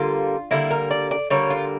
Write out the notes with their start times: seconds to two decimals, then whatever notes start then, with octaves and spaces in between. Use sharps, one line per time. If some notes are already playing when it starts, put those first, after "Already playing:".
Already playing: D3 G3 A#3 F4
0.51 D3 G3 A#3 E4
0.71 A#4
0.91 D5
1.11 D5
1.30 D3 G3 A#3 C#5
1.50 F4